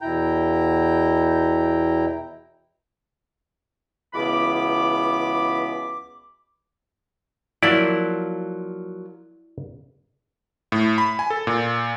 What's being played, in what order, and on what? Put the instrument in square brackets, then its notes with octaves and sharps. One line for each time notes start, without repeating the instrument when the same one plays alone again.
[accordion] E2 B2 E4 G5 A#5 G6
[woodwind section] C#2 B2 E3 B3 B5 D6
[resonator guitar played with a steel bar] F3 F#3 A#3 [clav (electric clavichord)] E4 D5
[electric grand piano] A2
B5
G#5
A4
A#2